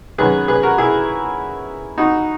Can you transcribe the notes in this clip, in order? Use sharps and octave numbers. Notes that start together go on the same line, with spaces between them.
F#2 D#3 G#4 B4
G#4 B4
F#4 A#4
E4 G#4
D#4 F#4